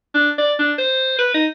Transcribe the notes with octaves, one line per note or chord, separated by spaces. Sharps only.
D4
D5
D4
C5
B4
D#4